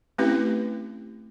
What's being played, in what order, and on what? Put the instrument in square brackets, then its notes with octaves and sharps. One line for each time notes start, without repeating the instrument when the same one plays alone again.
[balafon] A3 C4 C#4 E4 G4 B4